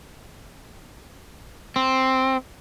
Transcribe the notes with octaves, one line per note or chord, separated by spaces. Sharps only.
C4